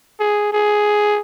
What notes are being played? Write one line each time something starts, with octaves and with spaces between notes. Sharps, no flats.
G#4
G#4